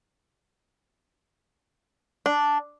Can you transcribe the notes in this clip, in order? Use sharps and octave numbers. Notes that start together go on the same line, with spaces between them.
D4